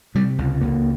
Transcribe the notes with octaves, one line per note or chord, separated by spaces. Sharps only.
C3 G3
C#2
C#2 A#3